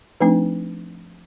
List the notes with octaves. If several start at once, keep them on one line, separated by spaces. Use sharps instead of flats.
F3 A3 C4 D4 D#4